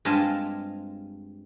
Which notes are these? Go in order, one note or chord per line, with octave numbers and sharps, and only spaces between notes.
G2 G#3 C4 F4 G#5 A5